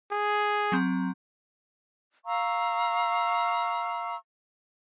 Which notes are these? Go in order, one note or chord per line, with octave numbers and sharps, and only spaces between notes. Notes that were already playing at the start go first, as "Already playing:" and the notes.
G#4
F#3 C4 A#5
F5 A#5 C#6 E6